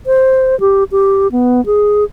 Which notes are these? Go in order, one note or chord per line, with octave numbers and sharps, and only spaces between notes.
C5
G4
G4
B3
G#4